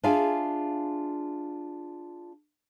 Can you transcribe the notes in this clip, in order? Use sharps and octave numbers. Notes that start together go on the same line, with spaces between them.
D4 F4 G#4 E5 F5 G#5